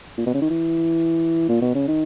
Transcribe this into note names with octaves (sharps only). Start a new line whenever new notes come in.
A#2
B2
C#3
D#3
E3
A#2
B2
C#3
D#3